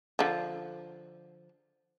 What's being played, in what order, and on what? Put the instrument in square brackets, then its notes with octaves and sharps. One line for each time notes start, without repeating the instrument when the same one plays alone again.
[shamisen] D3 F3